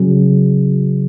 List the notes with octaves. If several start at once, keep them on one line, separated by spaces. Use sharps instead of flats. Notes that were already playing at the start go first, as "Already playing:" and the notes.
Already playing: C#3 F#3